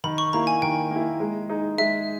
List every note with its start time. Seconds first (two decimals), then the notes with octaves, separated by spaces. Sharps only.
0.04 D#3 B5
0.18 C#6
0.33 A#3 E4 A#5
0.47 G#5
0.62 D#3 G5
0.91 A#3 E4
1.20 G#3
1.49 D#4 G#4
1.78 G#3 E5